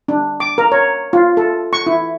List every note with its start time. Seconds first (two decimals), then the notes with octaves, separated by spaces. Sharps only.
0.08 D4
0.40 D6
0.58 A#4
0.72 C#5
1.13 F4
1.37 A4
1.73 C#6
1.86 E4